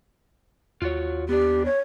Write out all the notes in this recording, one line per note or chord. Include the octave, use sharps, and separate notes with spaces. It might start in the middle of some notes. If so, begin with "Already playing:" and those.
D#2 F4 F#4 C#5
B3 D4 G4
C#5